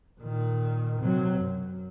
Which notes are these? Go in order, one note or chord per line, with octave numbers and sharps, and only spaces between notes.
A#2 D#3
C3 F#3
F#2